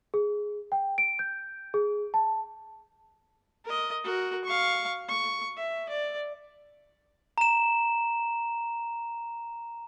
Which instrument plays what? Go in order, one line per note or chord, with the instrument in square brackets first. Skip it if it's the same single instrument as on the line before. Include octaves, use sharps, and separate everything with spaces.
[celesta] G#4
G5
D7
G6
G#4
A5
[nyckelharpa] A#4 D#5
F#4 A#4
F5 C#6
C#6
E5
D5
[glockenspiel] A#5 E7